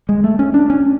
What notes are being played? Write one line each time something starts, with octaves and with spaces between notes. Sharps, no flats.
G#3
A3
C#4
D4
C#4